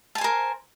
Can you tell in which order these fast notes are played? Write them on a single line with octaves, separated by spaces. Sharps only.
A5 G#5 C5 A#4